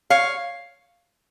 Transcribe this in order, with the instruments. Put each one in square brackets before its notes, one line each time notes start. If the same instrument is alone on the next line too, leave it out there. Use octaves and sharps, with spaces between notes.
[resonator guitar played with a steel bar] C#5 F5